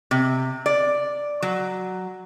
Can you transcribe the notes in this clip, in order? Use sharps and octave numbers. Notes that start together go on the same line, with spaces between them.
C3
D5
F#3